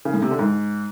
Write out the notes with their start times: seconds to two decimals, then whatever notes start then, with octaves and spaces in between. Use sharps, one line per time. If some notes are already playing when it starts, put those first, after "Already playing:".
0.05 C#3
0.14 A2
0.22 C3
0.31 D3
0.39 G#2